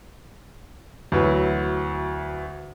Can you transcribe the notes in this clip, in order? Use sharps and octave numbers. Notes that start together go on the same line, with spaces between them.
D2 E3 F#3